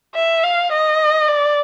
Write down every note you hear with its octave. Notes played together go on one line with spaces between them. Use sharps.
E5
F5
D#5
D5